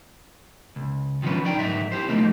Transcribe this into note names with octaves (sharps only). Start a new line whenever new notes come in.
C#2
D#3 F3 F#3 C4 C#4 B4
D#4 D5 G5
D2 G#2 F#3 D#4 E5
E4 G4 C5
F3 G3 A3 A#3 D#4